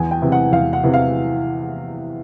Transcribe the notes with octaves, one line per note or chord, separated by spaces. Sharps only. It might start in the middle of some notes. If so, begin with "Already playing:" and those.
Already playing: E2 G#5
G5
C3 E3
F#5
E2 F5
F#5
C3 E3
F5